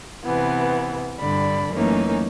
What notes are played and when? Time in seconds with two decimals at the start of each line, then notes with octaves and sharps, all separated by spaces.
0.23 C3 E3 B3
1.19 G2 D3 D5 B5
1.73 F#2 E3 A3 A#3 C#4 D#4